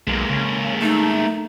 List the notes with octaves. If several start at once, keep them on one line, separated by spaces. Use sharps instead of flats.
B1 G#3 A#3
C#3
A3 D#4